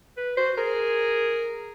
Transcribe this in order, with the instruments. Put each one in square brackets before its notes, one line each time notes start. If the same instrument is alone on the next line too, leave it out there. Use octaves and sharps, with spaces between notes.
[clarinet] B4
[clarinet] F#4 [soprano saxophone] C5
[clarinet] G#4 [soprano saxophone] A#4